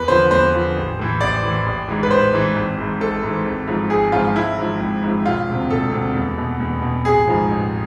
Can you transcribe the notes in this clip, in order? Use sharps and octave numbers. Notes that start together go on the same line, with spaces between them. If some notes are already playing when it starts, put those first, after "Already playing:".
Already playing: E2 B4
D3 F3 C5
E2 C5
D3 F3
A1
A2 E3
A1 D5
A2 E3
A1
G#2 E3
B4
A1 C5
G#2 E3
G#1
G#2 E3
G#1 A4
G#2 E3
G#1
G#2 F3
G#1 G#4
G#2 F3 F4
G#1 E4
G#2 F3
G#1
G#2 F3
E1 F4
D2 C3
E1 A4
D2 C3
E2
B2
E2
B2
A1 G#4
G#2 F3
A1